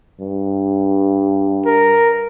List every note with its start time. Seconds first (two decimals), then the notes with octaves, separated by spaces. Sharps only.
0.20 G2
1.66 A#4